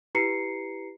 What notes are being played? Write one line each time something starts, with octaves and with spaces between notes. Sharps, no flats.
E4 G4 B4 A#5 C7 C#7